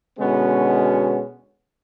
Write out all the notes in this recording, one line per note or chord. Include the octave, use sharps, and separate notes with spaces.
B2 D3 G#3 B3 C#4 F#4